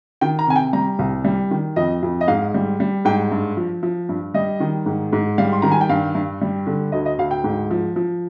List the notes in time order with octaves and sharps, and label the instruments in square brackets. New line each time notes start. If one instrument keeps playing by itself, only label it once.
[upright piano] D#3 G5
A#5
C3 G#5
G5
G3 A#5
C2
G3
D#3
F2 D#5
F2
D#5
G#2 F5
G3
G3
G#2 G5
G2
F3
F3
G2
G3 D#5
D#3
G#2
G#2
G3 F5
C6
D#3 A#5
G#5
G5
G2 F5
G2
G3
D3
D2 D#5
D#5
D2 F5
G5
G#2
F3
F3